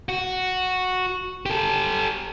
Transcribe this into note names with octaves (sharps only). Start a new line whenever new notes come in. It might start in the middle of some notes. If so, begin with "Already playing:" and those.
F#4
G4 A4